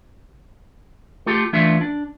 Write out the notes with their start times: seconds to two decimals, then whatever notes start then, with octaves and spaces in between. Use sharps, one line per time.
1.26 A3 F4 G4 A4
1.53 E3 A3 D4 F4 E5
1.81 D4